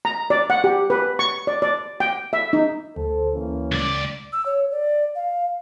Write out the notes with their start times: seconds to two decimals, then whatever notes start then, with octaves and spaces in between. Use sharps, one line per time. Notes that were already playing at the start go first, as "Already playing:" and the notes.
0.05 A#5
0.30 D5
0.50 F#5
0.64 G4
0.90 B4
1.19 C#6
1.47 D5
1.62 D5
2.00 G5
2.33 E5
2.53 D#4
2.96 D2 A4 C5
3.34 E3 A#3 C#4
3.72 C#2 D5
4.32 E6
4.46 C#5
4.71 D5
5.15 F5